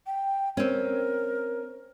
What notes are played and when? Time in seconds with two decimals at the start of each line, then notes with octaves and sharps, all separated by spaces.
0.06 G5
0.57 C4 C#4 A#4